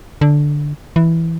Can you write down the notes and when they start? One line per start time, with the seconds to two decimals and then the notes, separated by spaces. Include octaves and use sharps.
0.21 D3
0.96 E3